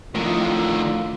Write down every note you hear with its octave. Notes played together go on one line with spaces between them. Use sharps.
F2 A2 D3 D#3 F4